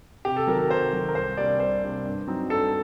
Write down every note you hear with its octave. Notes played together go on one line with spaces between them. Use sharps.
C3 G4
A4
D#3 F#3 A#4
A#4
C3 C5
D#3 F#3
A#4
C2 C5
C3 G3 A#3 D4 D5
C2 C5
C3 G3 A#3 D4
G2
F#3 C4 D#4
G2 A4